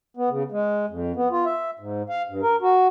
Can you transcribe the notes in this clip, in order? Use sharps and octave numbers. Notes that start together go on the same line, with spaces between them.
B3
C#3
G#3
F2
B3
F4
E5
G#2
F5
G2
A#4
F#4